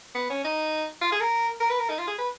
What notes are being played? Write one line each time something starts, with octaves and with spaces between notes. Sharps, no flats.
B3
C#4
D#4
F4
G#4
A#4
A#4
B4
A#4
D#4
F4
G#4
B4